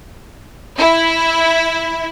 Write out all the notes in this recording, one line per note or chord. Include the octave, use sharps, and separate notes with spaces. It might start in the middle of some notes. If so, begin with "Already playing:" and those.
E4